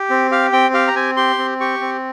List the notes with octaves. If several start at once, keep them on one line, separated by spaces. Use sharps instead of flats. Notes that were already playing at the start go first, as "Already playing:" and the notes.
Already playing: G4
C4
G4 F5
C4 G5
G4 F5
A#5
C4 G#5
G4 C6
C4
G4 C#6
C4